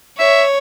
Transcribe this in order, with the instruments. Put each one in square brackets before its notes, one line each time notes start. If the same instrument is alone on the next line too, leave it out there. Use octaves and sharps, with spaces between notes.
[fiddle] C#5 [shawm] E5